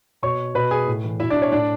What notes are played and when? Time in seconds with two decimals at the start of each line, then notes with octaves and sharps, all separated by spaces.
0.22 B2 C#5 C#6
0.55 B2 B4 B5
0.71 G#4 G#5
0.87 A2
1.04 E3
1.20 B2 E4 E5
1.30 D4 D5
1.42 C#5
1.52 A2 D4 D5